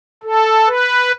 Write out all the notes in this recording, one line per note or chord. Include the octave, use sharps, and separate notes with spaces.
A4
B4